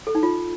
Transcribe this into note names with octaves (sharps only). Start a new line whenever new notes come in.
A4
D#4
F4